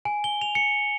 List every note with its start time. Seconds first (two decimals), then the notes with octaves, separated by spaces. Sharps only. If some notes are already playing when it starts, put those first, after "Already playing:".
0.05 G#5
0.24 G7
0.41 F7
0.55 C#7